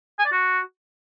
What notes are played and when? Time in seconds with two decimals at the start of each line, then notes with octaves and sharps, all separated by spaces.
0.19 G#5
0.25 D5
0.32 F#4